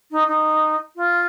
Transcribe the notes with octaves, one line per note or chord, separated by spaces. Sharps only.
D#4
D#4
F4